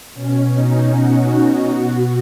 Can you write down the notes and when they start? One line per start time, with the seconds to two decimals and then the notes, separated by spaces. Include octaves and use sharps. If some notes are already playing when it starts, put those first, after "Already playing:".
0.14 B2 C#4
0.52 D#4
0.92 F#4
1.68 B2 F#4